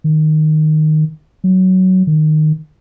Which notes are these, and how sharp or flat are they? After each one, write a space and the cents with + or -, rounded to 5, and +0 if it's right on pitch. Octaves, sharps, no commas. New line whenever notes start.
D#3 -10
F#3 +10
D#3 -15